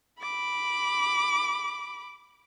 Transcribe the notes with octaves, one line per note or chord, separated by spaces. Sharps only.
B5 D6